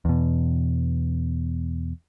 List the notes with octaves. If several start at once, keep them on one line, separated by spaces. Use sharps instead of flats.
E2 B2